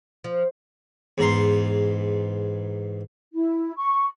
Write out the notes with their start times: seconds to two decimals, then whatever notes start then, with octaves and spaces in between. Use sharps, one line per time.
0.24 F3
1.18 E2 G#2 A#5 C6
3.34 E4
3.76 C#6